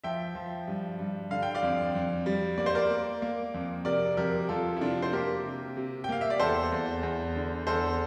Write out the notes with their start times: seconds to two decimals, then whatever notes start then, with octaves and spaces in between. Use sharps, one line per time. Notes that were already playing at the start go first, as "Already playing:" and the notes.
0.04 F3 E5 G5
0.35 F3
0.67 G2
0.99 G2
1.30 D3 F5
1.43 G5
1.55 D5 F5
1.62 F2
1.95 F2
2.26 G3
2.58 A#3 D5
2.66 C5
2.75 A#4 D5
2.90 A#3
3.22 A#3
3.54 F2
3.85 C3 A#4 D5
4.17 F2 G4 A#4
4.49 F2 F4 A4
4.77 E4
4.81 C3 D4 F4
5.02 C5
5.13 A#3 G4 A#4
5.44 C3
5.77 C3
6.04 G5
6.09 A#3 F5
6.21 E5
6.30 D5
6.40 E2 A4 C5
6.72 E2
7.03 E2
7.36 D3
7.67 E2 A4 C5